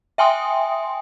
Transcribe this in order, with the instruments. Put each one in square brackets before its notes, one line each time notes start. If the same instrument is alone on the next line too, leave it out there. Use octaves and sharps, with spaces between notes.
[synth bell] E5 G5 G#5 C6 D#6